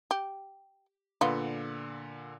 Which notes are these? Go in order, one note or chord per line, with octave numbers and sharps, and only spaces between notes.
G4
A#2 D3 B3 F4